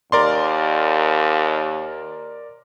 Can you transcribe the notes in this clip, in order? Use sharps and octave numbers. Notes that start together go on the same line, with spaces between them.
D#2 A#4 D5 C6